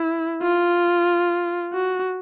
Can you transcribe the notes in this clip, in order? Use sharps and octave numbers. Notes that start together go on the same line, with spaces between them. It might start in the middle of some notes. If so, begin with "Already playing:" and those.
Already playing: E4
F4
F#4